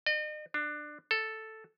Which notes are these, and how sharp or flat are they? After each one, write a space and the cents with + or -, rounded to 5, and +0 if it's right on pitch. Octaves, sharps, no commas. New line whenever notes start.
D#5 -40
D4 +20
A4 +0